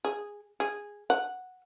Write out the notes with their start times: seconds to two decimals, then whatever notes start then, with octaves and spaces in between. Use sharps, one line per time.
0.05 G#4
0.60 G#4
1.10 F#5